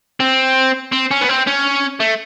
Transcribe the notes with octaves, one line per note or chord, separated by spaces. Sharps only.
C4
C4
C#4
B3
C4
C#4
A3